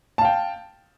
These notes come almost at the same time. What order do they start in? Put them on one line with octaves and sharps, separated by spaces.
A5 F5 G5